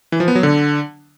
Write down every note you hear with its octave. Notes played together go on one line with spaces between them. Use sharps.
E3
F3
B3
F#3
D3